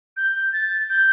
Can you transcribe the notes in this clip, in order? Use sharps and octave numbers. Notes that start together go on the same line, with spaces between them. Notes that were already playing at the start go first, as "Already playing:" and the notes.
G6
A6
G6